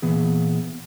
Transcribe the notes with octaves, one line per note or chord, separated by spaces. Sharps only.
A#2 E3 B3 G#4